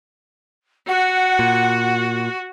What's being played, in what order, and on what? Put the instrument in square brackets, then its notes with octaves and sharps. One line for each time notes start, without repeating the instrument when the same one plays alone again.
[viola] F#4 [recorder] F#5
[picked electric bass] A#2